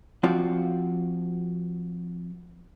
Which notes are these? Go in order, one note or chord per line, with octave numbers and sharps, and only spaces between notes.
F3 C4 F4 F#4 D5